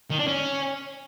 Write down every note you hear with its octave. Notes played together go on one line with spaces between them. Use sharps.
D#3
D4
C#4